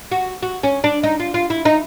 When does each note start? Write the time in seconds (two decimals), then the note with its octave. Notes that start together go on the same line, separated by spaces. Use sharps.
0.12 F#4
0.42 F#4
0.63 C#4
0.84 D4
1.03 D#4
1.20 F4
1.34 F4
1.50 E4
1.65 D#4